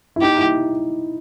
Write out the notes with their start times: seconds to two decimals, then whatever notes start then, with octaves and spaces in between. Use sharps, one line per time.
0.16 E4
0.21 D#4 G4
0.37 E4